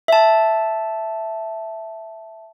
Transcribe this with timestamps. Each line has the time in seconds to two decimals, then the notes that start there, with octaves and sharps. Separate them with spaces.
0.08 E5 A5